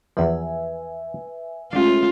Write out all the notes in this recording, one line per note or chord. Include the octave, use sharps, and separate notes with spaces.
E2 F3 B4 E5 G#5
G#3 A3 C#4 D4 F4 G4